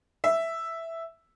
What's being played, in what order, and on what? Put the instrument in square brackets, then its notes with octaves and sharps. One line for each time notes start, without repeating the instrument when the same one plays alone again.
[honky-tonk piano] E5